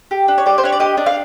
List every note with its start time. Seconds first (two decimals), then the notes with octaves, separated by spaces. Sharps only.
0.11 G4
0.28 D4
0.38 C#5
0.46 G4 D5
0.58 C5
0.63 D4 C#5
0.72 D5
0.80 G4 D#5
0.97 D4
1.06 F5